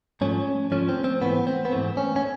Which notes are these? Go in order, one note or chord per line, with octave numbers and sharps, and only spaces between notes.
G#2 F3 A3 C#4
G#2 F3 A3 C#4
C4
C4
G#2 E3 A3 B3
C4
B3
G#2 E3 A3 C4
C#4
C#4